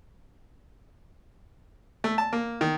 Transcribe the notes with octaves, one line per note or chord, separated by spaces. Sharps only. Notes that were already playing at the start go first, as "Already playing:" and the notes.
A3
A5
A#3
D#3